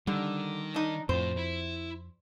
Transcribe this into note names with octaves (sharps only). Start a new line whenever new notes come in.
D3 D#3 G3
D4 D#4
F2 A2 C5
E4